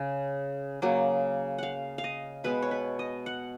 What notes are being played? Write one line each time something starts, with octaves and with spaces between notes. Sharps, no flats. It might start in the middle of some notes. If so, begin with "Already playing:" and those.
Already playing: C#3
C#3 F#3 A#3
F5 F#5
F5
D#5
B2 G#3 B3 B4
C#5
B4
D#5
F#5